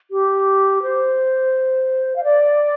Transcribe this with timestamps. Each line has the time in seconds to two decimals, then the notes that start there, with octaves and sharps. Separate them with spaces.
0.11 G4
0.83 C5
2.16 F5
2.24 D5